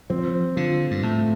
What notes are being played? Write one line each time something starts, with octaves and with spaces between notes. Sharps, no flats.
F3 C4
D3 F3
G2
A2 A3